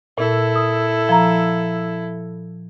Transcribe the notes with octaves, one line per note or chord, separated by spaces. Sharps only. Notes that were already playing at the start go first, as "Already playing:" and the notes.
A#2 E4 A4
D#6
F3 A#5